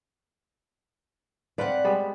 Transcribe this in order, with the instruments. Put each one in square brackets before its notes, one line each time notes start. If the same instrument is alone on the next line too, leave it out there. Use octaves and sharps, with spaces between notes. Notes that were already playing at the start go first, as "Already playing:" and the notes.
[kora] C4 B4 F5 [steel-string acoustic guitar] D5 F#5
[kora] G3 G#3 B3